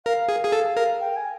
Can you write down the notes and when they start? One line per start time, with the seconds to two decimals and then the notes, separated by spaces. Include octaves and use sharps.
0.06 A#4 F5
0.29 G#4
0.44 G#4
0.52 A4
0.77 A#4
1.00 G5
1.15 G#5